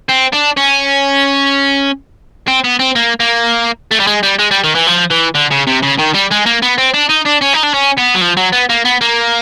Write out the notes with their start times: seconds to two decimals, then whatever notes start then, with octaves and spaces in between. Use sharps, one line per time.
0.09 C4
0.33 D4
0.57 C#4
2.48 C4
2.64 B3
2.79 C4
2.96 A#3
3.20 A#3
3.92 A3
4.00 G3
4.07 G#3
4.23 G3
4.39 G#3
4.51 G3
4.64 D#3
4.75 E3
4.87 F3
5.11 E3
5.35 D3
5.51 C#3
5.67 C3
5.82 C#3
5.98 D#3
6.14 G3
6.31 G#3
6.46 A#3
6.62 B3
6.78 C4
6.94 D4
7.10 D#4
7.26 D4
7.42 C#4
7.54 D#4
7.64 D4
7.74 C#4
7.98 B3
8.15 F#3
8.21 F3
8.37 F#3
8.53 B3
8.70 A#3
8.85 B3
9.01 A#3